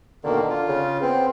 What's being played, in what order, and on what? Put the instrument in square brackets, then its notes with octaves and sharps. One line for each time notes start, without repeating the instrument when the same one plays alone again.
[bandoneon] B2 D#3 A#3 [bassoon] D3
[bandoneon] F4
[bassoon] C#3
[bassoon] B3 [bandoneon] C4